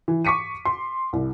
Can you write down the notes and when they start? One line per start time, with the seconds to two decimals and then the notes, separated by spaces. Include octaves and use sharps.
0.08 E3
0.25 C#6 D6 B6 C#7 D#7
0.65 C6
1.13 C2